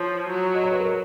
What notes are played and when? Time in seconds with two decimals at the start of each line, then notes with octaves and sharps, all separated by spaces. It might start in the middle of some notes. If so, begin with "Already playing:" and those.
Already playing: F3 C#5
0.29 F#3
0.55 D#5
0.64 C#5
0.72 B4
0.80 A#4